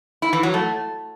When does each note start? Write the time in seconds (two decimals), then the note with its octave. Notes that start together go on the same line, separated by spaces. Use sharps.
0.22 E4
0.33 E3
0.43 F#3
0.54 A3